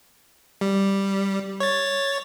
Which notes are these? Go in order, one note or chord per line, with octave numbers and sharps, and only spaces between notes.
G3
C#5 A6